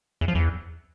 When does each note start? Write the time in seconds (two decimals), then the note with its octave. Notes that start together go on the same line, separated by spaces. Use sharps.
0.21 E2
0.28 F3
0.35 E2